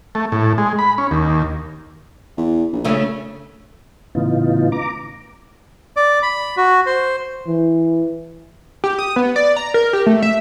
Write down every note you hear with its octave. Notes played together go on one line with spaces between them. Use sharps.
A3
A2
G#3
B5
C#4
D#2
E2
A#1
C#3 A3 C#4
A2 C#3 E3 B3 D#4 F4
A#5 D6
D5
B5
F#4
C5
E3
G4
D#6
B3
D5
A#5
A#4
G4
A3
E5